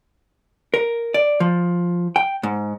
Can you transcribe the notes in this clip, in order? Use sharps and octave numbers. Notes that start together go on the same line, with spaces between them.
A#4
D5
F3
G5
G#2